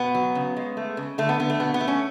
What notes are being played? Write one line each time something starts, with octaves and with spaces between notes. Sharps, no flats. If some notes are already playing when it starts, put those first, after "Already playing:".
Already playing: B2 B3
F#3
C#3
G#3
A3
C#3
D3 A3
B3
D3 B3
A3
B2 B3
B3
A3
C#4